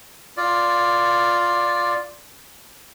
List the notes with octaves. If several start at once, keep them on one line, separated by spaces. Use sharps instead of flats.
F4 D5